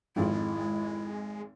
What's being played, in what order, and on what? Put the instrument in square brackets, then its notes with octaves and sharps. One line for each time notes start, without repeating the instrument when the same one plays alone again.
[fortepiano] G#1 F2 [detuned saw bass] G#3 [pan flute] E4